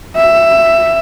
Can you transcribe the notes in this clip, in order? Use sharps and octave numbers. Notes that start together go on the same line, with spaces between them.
E5